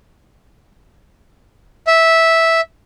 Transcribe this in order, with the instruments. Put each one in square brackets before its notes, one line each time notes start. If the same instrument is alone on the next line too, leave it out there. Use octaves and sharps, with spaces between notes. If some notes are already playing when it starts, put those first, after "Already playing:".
[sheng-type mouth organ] E5